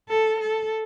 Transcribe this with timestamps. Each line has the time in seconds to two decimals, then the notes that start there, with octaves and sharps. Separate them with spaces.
0.09 A4
0.40 A4